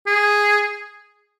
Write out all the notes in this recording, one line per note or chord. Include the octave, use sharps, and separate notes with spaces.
G#4